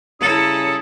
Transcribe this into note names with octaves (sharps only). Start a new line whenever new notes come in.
C#3 G3 C#4 E4 A4 A#5 D#6